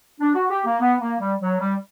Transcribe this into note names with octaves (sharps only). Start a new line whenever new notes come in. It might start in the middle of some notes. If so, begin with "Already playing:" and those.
D4
F#4
G4
A#3
B3
A#3
G3
F#3
G3